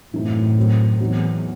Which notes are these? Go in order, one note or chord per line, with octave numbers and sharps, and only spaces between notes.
F#2 A2 E3 A3 C4 D#4
D#3 F#3 C4
E2 F#3 C4 D#4